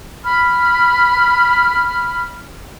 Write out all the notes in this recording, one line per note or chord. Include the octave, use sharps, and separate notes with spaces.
B5 F6